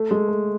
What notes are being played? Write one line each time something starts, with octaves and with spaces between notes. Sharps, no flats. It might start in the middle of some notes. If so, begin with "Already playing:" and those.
Already playing: A3
G#3
A3